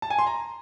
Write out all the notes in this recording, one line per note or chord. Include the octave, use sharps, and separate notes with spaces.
A5
G#5
C6
A#5